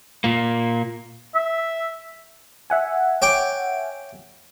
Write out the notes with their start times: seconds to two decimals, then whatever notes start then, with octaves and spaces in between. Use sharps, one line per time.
0.24 A#2 A#3
1.35 E5
2.70 E5 F#5 G#5
3.22 C#5 G5 D6